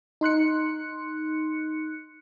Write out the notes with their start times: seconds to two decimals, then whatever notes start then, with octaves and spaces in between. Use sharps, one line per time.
0.21 D#4 C6 F#6 C#7